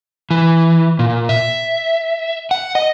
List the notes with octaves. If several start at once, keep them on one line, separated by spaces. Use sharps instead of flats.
E3
A#2
E5
F#5
D#5